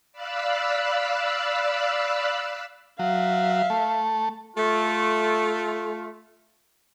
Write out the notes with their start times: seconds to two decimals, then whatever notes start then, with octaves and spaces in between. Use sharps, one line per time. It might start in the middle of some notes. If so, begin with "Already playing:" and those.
0.12 D5 F5 B5 E6 F#6
2.99 F#3 E5 F5
3.70 A3
4.56 A3 F4